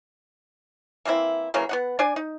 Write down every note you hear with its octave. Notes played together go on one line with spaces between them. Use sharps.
E3 A#3 C4 E4
C#3 E3 F#3 A#3
B3 D#4 F#5
D4 D5 G#5
D#4